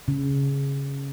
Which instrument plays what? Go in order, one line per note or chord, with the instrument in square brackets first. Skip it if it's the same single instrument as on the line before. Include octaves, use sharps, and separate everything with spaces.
[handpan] C#3